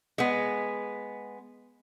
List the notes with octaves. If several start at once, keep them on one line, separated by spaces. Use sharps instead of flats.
G#3 B3